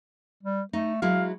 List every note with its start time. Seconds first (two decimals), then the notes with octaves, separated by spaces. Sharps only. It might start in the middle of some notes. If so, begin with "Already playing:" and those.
0.43 G3
0.73 A3 D#4
1.02 F#3 G#3 E4 F5